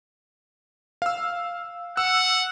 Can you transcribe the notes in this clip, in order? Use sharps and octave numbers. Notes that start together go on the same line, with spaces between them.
F5 E6
F#5 E6